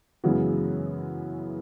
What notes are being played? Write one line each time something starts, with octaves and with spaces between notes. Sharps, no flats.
F#2 C#3 E3 G#3 B3 F#4